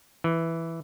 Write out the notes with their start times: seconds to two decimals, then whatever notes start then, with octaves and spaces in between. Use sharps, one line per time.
0.24 E3